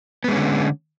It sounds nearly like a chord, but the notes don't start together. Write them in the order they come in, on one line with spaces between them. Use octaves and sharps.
B3 G#3 C#4 D3